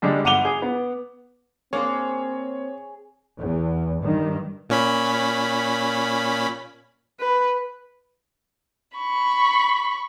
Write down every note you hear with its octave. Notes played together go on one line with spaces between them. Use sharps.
D3 G3 G#3 D4
G1 F#5 D6 D#7 F7 G7
G#4
B3
A#3 C4 D4 G#4 C5 C#5
E2
G2 D#3
A#2 C#4 B5
B4
B5 C#6